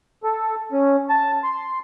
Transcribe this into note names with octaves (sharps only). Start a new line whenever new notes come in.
A4
C#4
A5
C6